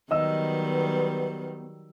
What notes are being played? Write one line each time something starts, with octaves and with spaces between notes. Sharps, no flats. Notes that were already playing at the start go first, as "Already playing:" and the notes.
D#3 F#3 G3 B3 D#5 E6